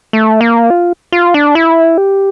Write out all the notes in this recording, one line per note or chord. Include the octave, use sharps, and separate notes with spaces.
A3
A#3
F4
F4
D4
E4
G4